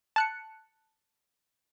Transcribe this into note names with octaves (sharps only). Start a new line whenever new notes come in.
A5 F#6 C#7